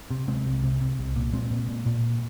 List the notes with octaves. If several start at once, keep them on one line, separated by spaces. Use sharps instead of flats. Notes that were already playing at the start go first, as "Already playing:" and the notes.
C3
C3 G#3 C4
C2
C3
C3
C2
A#2
A#2 G#3 C4
A#2
A#2
A#2